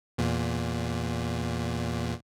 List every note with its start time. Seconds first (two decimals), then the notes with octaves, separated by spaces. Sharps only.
0.18 E2 A#2